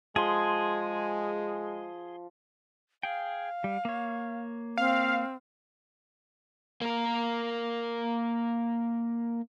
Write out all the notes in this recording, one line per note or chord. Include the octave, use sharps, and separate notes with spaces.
F3 G#3 G#4 C6
G#4 F5 G5
G3
A#3 C#5
C4 F5
A#3 A#4